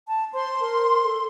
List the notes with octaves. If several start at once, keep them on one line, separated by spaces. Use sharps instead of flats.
A5
C5 C6
A#4
A4